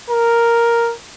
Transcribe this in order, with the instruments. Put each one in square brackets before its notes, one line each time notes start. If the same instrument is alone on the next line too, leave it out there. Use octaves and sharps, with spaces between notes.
[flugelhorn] A#4